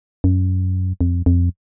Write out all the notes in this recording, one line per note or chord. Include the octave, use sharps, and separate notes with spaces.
F#2
F2
F2